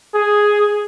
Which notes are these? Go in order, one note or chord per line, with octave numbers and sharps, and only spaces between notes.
G#4